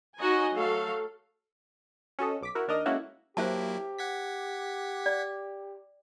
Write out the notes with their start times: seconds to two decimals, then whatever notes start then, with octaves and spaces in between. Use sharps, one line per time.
0.18 D#4 F#4 C#5 D#5 G#5
0.53 F#3 A3 A4 F5
2.19 C#4 F#4 A4 D#5
2.41 B1 D6 B6
2.55 E4 F#4 A#4
2.68 D#2 D4 A#4 D#5 A#6 D#7
2.86 G#3 A#3 C#4 E4 F#4 A4
3.37 F#3 A#3 E4 G4 C5 E5 A5
3.99 F#5 G#6 B6
5.06 D5